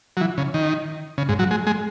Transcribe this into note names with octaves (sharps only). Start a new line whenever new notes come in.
F#3
E3
C#3
D#3
C#3
G#2
F#3
G#3
G#3